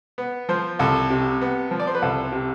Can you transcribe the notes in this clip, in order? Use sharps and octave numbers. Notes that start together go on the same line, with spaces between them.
B3
F3 C5
C2 A4
C3
B3
F3
D5
C5
B4
C2 A4
C3